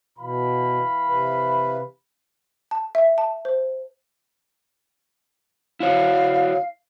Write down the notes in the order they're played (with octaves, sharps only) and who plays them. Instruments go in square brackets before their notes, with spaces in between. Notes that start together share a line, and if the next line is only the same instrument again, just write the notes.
[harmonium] B2 [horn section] E3 F5 B5
[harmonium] C3 B4
[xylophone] A5
E5
A5
C5
[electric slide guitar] E4 F#4 C#5 [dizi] F5